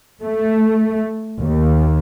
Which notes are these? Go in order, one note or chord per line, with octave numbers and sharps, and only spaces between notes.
A3
D#2